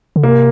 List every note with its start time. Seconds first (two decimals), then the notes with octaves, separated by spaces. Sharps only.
0.16 D3
0.23 C3 A#3